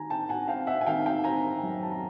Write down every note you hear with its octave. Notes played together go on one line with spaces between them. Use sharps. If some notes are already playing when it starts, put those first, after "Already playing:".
Already playing: D#3 G#5 A#5
C4 G5 A5
F#5 G#5
C4 F5 G5
E5 F#5
G#5
D#3 F5 G5
F5 G5
C4 G#5 A#5
F#2
A5
A#5